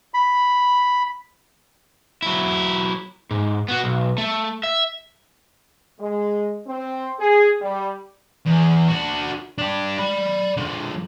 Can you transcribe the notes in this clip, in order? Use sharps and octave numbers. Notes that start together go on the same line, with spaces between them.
B5
F#3 E4
G#2
B3 F#4
B1
A3
E5
G#3
C4
G#4
G3
E2
D4 F#4
D4 G4
D5 B5
D3 F3